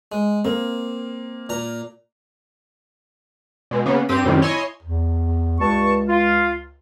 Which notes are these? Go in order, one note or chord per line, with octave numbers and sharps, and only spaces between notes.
G#3
A#3 C4
A#2 A#5
B2 G#3
C#3 A#3 B3
G2 C4 G4 D#7
F#2 A2 C3 D#3 G3
E4 C#5 D#5 G#5 C6
E2
C#2 G2 A5 C#6
F4